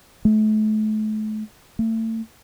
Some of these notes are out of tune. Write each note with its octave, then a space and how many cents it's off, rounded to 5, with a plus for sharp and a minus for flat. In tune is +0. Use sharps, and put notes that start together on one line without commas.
A3 -35
A3 +35